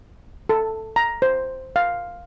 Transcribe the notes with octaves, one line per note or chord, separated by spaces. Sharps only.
A4
A#5
C5
F5